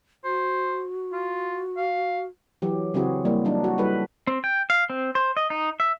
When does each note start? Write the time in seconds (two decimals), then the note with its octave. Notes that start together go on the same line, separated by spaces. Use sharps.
0.25 F#4 C5
1.12 F4
1.77 F5
2.62 E3 F#3 G4
2.94 C#3 F#3 C4 E4 F#4 G#4
3.25 G3 A#3 E4
3.45 F#3 D4 D#4
3.64 F#4
3.78 G3 E4 A4 B4
4.27 C4
4.44 G5
4.70 F5
4.90 C4
5.15 C5
5.37 D#5
5.50 D#4
5.80 E5